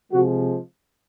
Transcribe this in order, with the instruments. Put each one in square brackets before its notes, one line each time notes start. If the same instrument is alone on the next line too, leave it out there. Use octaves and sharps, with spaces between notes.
[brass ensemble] C3 F3 G#3 F#4